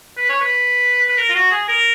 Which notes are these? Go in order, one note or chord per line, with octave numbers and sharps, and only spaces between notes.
B4
C#5
B4
B4
A#4
F4
F#4
G#4
A#4